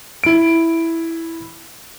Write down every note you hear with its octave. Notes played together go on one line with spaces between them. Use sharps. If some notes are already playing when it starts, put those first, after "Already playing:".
E4 D7